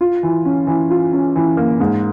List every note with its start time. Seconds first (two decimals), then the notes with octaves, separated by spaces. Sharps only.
0.01 F4
0.23 E3
0.45 C#4
0.67 E3
0.90 F4
1.13 C#4
1.35 E3
1.57 A#3
1.80 G#2